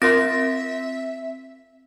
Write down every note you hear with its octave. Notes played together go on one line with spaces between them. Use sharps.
C4 F4 A#4 E5 C6 A#6